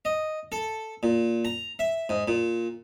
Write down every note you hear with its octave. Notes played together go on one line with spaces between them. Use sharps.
D#5
A4
A#2
A#5
E5
G#2
A#2